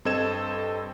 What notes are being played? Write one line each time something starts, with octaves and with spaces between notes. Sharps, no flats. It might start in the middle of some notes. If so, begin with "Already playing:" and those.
G2 C4 A4 D#5 G#6 E7